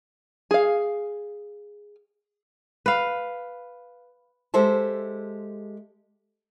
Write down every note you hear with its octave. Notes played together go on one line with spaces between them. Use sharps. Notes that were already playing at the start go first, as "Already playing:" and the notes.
G#4 F5
B4 F5
G#3 G4 A4 C5 E5 A5